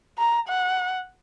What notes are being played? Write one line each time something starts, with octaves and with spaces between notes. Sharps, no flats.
A#5
F#5